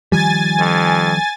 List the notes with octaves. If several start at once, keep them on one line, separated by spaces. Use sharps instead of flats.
D#3 F3 G3 G#5 A6
F2